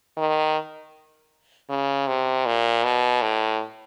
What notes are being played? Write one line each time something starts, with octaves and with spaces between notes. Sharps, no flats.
D#3
C#3
C3
A#2
B2
A2